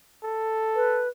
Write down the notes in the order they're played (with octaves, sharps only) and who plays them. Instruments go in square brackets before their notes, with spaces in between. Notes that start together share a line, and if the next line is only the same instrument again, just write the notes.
[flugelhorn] A4
[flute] B4